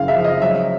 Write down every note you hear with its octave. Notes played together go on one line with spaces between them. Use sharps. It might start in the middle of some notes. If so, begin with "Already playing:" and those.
Already playing: F#1 C#3 F3 F5
E5
F3
D#5
F#3 E5